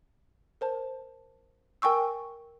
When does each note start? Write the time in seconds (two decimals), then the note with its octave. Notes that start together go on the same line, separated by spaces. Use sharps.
0.61 A#4 C5 A5
1.82 A#4 G5 G#5 C#6 E6